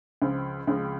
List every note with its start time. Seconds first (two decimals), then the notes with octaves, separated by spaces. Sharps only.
0.22 C#2 C#3 F3 G#3 C4
0.67 C#2 C#3 F3 G#3 C4